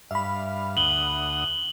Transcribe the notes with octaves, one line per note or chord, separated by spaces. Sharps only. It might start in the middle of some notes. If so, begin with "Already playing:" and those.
G2 E5 F5 B5
D2 F#5 D#6 F#7 G7